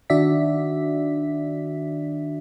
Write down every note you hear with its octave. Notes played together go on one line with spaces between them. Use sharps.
D#3 D4 F#4 D5 E5 B6